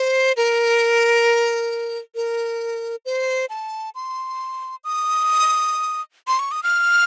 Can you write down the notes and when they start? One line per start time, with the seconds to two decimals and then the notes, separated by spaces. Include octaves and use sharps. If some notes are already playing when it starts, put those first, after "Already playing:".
Already playing: C5
0.37 A#4
2.15 A#4
3.05 C5
3.50 A5
3.95 C6
4.84 D#6
6.28 C6
6.39 C#6
6.52 D#6
6.63 F6